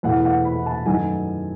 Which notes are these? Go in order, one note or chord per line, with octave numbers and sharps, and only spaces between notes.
E2 B2 A3 F#5
F#5
B5
A5
F#2 D#3 F#3 A3 G#5